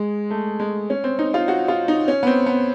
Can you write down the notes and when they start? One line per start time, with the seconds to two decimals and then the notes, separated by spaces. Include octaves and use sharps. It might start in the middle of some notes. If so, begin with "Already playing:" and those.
Already playing: G#3
0.30 A3
0.60 G#3
0.90 C#4
1.04 C4
1.19 D#4
1.34 F4
1.48 F#4
1.68 F4
1.88 D#4
2.08 C#4
2.23 B3
2.27 C4
2.46 B3